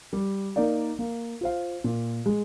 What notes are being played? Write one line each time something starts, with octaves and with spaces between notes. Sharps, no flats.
G3
A#3 D#4 A#4 D5
A#3
F4 C5 F5
A#2
G#3